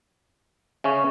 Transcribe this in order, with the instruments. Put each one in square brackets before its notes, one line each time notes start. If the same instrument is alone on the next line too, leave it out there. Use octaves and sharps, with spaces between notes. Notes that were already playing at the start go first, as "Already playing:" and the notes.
[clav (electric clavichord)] C#3 C#4 [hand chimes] E5 C#6